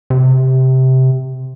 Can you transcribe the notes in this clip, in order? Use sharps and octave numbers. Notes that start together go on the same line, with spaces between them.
C3